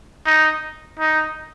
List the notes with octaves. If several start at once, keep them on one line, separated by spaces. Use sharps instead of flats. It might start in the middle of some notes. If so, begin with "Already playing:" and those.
D#4
D#4